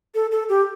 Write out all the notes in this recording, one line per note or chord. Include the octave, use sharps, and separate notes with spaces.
A4
A4
G4